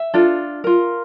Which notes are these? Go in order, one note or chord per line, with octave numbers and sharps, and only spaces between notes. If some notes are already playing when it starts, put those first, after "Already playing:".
Already playing: E5
D4 F4 A4
F4 A#4